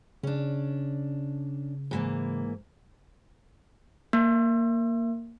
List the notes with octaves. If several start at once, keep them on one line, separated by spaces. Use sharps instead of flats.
C#3 C#4 D4
G#2 E3 A#3
A#3